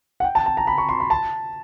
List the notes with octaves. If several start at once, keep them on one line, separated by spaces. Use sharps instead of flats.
F#5
G5
A5
A5
A#5
B5
C#6
C6
B5
A5